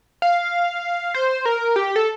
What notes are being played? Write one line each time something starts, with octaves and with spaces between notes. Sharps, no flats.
F5
C5
A#4
G4
A4